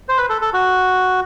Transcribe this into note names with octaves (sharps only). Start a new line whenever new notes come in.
C5
B4
A4
A4
F#4